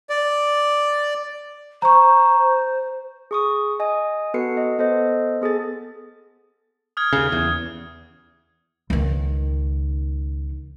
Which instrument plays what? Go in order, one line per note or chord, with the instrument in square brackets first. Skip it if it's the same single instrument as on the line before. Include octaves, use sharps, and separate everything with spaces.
[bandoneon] D5
[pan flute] C5 [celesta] A#5 C#6
[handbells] G#4 C#6 D#6
D#5 G#5 D#6
B3 F#4 A4 B4 C7 C#7
D#5
B3 A4 C5 D#5
B3 G#4 A4 A6
[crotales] D#6 F6 G#6
[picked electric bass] D#2 C#3
E2
[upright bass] C#2 D#3